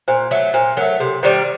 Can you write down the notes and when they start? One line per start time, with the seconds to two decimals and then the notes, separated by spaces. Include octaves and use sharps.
0.08 A#2 C5
0.31 F#3 A3
0.54 A#2 C5
0.77 F#3 A#4
0.80 A3
1.00 C3 A4
1.23 D#3 G3 C5